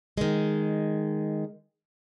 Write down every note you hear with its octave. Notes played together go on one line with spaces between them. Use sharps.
D#3 G#3